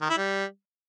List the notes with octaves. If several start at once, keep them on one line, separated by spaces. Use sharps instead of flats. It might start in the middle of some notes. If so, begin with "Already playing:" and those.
D#3
E4
G3